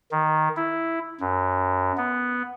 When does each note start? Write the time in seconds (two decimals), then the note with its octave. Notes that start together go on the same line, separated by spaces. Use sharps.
0.11 D#3
0.56 E4
1.21 F#2
1.97 B3